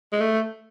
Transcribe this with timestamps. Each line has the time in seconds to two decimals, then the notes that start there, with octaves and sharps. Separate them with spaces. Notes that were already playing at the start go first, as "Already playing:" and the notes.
0.12 G#3
0.21 A3